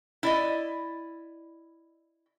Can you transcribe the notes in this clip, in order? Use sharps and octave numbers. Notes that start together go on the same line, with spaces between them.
E4 D5 D#5